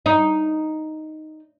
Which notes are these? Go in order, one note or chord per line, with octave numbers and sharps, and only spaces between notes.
D#4